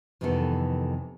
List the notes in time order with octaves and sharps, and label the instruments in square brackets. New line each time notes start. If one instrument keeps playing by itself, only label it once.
[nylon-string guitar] F2 C3 D#3 E3 B3 A4